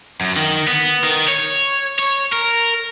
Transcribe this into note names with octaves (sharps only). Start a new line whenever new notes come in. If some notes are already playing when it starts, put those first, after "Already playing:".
F#2
D#3
B3
D#3
C#5
C#5
A#4